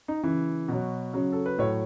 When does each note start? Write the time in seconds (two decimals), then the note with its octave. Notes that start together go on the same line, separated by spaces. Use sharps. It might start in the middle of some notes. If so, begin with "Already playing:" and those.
0.08 D#4
0.23 C#3 E3
0.68 B2 F#3
1.13 C#3 F#3
1.32 A4
1.46 B4
1.59 A2 F#3 C#5